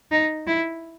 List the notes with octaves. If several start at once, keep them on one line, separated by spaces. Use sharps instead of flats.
D#4
E4